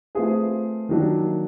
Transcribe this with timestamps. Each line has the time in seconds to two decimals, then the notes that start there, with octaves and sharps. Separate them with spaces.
0.15 A3 C4 F4 G#4 B4
0.89 D#3 F#3 A#3 D4